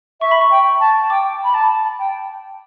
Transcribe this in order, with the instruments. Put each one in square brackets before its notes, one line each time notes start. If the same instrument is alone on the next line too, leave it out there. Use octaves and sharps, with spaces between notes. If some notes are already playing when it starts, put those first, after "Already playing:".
[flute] E5 [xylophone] C#6
[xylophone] B5
C#6
[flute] G5
A5
[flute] G5 [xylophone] D6
[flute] B5
A5
G5